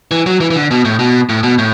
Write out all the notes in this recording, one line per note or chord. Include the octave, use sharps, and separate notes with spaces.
E3
F#3
E3
E3
D3
B2
A2
B2
A2
B2
A2